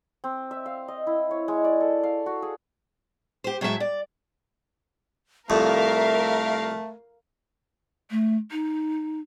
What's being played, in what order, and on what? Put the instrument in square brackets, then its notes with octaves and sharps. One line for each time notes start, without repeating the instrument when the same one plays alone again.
[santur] C4
E5
F5
D#5
E4
C#5
G#3
D5
A4
F5
F#4
G#4
[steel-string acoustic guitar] G4 C5
A2 F#3 G#3 A4 E5 A5
D5
[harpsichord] C2 F2 [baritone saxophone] A3 [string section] A#4 F5 [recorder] E5
[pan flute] A3
D#4